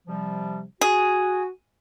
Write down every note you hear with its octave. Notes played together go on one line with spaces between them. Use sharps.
C3 F3 G3
F#4 G#4